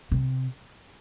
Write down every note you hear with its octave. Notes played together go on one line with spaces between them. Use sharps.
C3